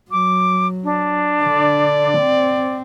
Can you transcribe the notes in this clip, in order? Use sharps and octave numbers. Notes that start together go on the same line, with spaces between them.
F#3 D6
D4
D3 D5
C4